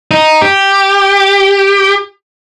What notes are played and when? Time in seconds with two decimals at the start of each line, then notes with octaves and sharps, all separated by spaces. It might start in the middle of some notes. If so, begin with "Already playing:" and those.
0.11 D#4
0.42 G4